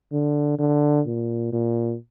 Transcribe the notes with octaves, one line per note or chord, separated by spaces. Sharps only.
D3
D3
A#2
A#2